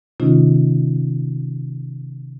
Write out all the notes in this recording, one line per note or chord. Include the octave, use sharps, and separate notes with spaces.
C3 D#3 A3 C#4 D#4 F4